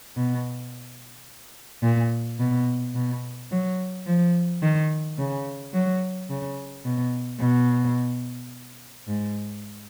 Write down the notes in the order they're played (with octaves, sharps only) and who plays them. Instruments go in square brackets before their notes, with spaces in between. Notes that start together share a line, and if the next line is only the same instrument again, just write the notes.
[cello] B2
A#2
B2
B2
F#3
F3
D#3
C#3
F#3
C#3
B2
B2
G#2